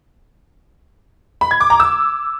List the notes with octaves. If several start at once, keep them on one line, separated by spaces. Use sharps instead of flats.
B5
G#6
D6
A#5
E6